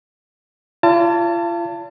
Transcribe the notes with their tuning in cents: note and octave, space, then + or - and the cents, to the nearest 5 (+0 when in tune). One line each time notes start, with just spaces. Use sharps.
F4 -40 D5 -45 A5 +25